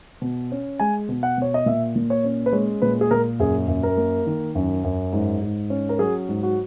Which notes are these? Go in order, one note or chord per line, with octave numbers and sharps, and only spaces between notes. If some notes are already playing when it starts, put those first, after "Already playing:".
B2
C#4
G#3 G#5
B2
F#5
B2 C#5
D#5
A#2 E5
A#2
C#5
C#4
B4
G#3 C#5
A#2 B4
G#4
A#2 A#4
F#2 G#4
F#2
A#4
A#3
D#3
F#2
F#2
G#2
G#2
C#4
A#4
F#3 G#4
G#2
F#4